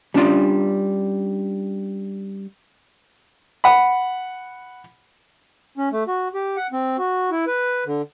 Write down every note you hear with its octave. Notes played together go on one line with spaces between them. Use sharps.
G3 C#4 D4 F4 D5
F#5 B5
C#4
A3
F#4
G4
F#5
C4
F#4
E4
B4
D3